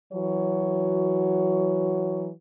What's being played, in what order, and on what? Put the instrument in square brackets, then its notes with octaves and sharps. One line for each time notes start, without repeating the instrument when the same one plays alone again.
[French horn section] E3 F#3 F#4 C#5